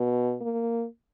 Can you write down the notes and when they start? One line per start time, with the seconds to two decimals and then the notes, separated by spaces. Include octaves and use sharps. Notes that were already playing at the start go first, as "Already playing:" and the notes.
Already playing: B2
0.41 A#3